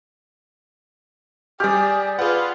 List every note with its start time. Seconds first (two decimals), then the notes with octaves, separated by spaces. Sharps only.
1.60 G3 G4 G#4 D5 F6
2.19 F4 G#4 B4 F#5